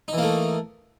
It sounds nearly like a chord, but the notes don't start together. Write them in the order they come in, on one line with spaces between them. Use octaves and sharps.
D#4 E3 A#3 A3